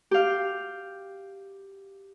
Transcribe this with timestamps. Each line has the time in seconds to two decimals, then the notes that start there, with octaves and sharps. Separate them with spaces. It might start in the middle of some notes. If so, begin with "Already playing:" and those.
0.11 G4 F5